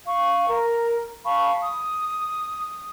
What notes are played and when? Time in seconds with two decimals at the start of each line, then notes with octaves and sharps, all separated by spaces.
0.06 F5 C#6
0.49 A#4
1.25 F5 A5 B5 C#6
1.63 D#6